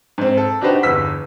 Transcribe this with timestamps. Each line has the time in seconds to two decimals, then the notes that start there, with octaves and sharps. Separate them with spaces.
0.18 G#2 C4
0.38 A4
0.61 D4 D#4 F#4 G4 B4 C5
0.83 G1 E2 E6 B6